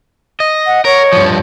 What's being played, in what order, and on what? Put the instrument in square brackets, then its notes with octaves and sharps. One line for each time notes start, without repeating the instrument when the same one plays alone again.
[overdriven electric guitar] D#5
[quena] F#5
[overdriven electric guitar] A#4 [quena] C#5
[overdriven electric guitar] G2 F3